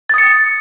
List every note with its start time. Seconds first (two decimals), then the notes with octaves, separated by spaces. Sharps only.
0.09 A6
0.14 D#6
0.18 C#7